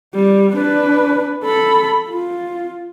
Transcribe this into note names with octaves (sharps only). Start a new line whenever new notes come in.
G3
D4 B4
A4 B5
F4